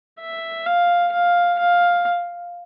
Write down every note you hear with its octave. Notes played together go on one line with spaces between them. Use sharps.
E5
F5
F5
F5